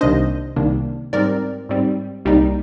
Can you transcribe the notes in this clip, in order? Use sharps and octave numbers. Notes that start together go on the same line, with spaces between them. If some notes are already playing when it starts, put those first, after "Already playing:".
C2 C3 D#3 A#3 D4 C5 D#5
C2 C3 D#3 A#3 D4
G#2 G3 C4 A#4 D5
G#2 G3 C4
C2 C3 G3 A#3 D#4